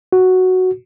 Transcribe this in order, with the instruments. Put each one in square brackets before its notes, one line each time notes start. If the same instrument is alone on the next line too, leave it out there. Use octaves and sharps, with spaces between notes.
[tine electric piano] F#4